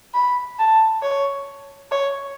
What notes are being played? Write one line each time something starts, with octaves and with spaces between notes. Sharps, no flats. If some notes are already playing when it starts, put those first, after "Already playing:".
B5
A5
C#5
C#5